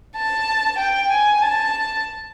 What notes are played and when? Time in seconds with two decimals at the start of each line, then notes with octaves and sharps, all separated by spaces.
0.16 A5
0.78 G5
1.11 G#5
1.42 A5